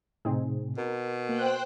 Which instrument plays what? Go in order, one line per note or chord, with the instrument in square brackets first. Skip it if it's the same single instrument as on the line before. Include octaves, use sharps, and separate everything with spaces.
[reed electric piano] A2 C3 [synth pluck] C4 D#4 G#4
[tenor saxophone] B2 [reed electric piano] A#4
[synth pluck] A#3 [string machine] C5 G5 F#6